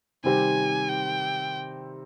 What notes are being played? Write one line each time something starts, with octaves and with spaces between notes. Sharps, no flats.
C3 D#3 G3 C4 G4 G#5
G5